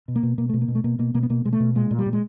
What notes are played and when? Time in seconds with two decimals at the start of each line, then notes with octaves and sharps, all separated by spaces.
0.08 B2
0.16 A#3
0.23 B2
0.38 B2 A#3
0.49 B2 A3
0.61 A#3
0.68 B2
0.75 A3
0.84 B2 A#3
0.99 B2 A#3
1.14 B2 A#3
1.23 B3
1.30 B2 A#3
1.45 B2 G#3
1.53 A3
1.60 B2
1.75 A#2 G#3
1.91 A#2
1.98 G3
2.06 A#2
2.13 G#3